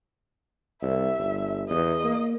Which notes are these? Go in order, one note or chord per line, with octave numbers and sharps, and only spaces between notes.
C2 E5
G1
E2 D#5
A#3